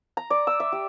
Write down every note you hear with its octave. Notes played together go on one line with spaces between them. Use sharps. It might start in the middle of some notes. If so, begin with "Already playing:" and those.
A#5
D5
E6
E5
G4